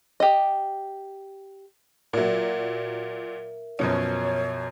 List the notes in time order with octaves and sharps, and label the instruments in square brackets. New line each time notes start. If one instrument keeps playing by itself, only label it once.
[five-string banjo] G4 D#5
[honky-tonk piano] A#2 F#3 [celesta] A#4 E5
[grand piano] F#2 B2 F3 [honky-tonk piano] C#4 [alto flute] C#5